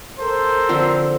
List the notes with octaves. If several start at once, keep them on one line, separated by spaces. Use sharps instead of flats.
A4 A#4 C5
D3 F3 C4